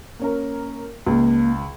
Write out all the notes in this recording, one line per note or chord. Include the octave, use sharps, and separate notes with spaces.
A#3 C#4 A#4
C#2 A#3